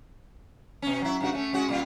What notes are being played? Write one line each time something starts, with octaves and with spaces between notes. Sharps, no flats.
B2 C#4
F#3 E4
G2 C#3 F#4
A3 C#4
G#3 C#4 F#4
A#2 G3 F4